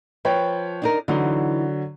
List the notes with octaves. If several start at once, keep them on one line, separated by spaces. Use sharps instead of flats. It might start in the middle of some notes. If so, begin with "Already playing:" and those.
F3 B4 C#5 G5
D4 D#4 A#4
D3 E3 F#3 D#4